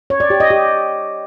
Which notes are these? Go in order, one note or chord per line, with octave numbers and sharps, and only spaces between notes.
C#5
D5
G4
D#5
G4